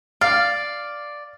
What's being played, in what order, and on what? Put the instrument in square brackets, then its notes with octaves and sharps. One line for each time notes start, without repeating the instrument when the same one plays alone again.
[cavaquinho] D5 [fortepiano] F5